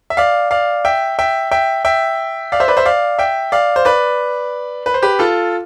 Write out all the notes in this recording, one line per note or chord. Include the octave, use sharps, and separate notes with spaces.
E5
D5 F5
D5 F5
E5 G5
E5 G5
E5 G5
E5 G5
D5 F5
C5 E5
B4 D5
C5 E5
D5 F5
E5 G5
D5 F5
C5
B4 D5
B4
C5
G4 B4
F4 A4